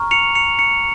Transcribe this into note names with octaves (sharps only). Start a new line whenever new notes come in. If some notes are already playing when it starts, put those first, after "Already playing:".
Already playing: A#5 C#6 F6
C#7 F7
C#7 F7
C#7 F7